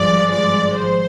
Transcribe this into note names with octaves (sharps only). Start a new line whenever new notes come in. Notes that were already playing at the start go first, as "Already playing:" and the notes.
Already playing: G#1 G2 F3 G#3 D5
D5
C5